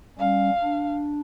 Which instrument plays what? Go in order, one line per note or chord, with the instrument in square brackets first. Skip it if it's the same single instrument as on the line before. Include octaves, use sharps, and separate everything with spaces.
[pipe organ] G3 C#4 [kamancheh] F5
[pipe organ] D4